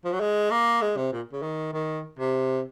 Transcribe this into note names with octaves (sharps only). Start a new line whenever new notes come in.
F3
F#3
G#3
A#3
G#3
C3
A#2
C#3
D#3
D#3
C3